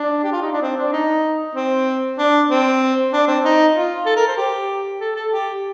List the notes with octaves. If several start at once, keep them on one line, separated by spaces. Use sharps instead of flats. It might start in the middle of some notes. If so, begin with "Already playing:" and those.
Already playing: D4
G4
F4
D#4
D4
C4
D4
D#4
C4
D4
C4
D4
C4
D#4
F4
A4
A#4
C5
G4
A4
A4
G4